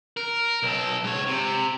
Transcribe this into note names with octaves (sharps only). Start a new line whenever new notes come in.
A#4
B1 A4
G#2 C#5
C3